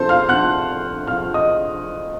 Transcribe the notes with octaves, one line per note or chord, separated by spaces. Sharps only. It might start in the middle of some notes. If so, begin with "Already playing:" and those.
Already playing: C3 F3 A4 C5 A5 C6
F5 F6
C3 F3 F#5 F#6
C3 F3 F5 F6
D#5 D#6